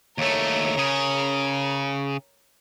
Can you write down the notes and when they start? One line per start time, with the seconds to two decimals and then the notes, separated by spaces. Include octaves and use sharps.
0.18 D#2 A3 A#4 C#5
0.77 C#3 G#4